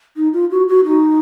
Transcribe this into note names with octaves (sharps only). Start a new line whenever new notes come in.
D#4
F4
F#4
F#4
D#4